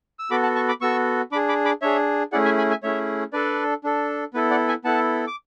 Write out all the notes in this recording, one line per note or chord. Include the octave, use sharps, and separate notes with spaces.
E6
B3 F#4 A4 B5 D6
F#5 A5
A5 C#6
B5 D6
B3 F#4 A4 C#6 E6
D4 G#4 B5 D6
B5 D6
B5 D6
D4 G#4 C#5 E5
A3 C#4 E4 G#4 D5 F#5
E5 G#5
G#5 B5
E5 G#5
A3 C#4 E4 G#4 C#5 E5
D4 A4 B4 D5
D4 A4
B3 E4 A4 B4
D5 F#5
E5 G#5
B3 E4 A4 F#5 A5
D6